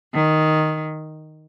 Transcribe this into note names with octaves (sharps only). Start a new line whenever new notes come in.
D#3